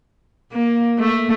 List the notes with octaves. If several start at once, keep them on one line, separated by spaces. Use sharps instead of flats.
A#3
A3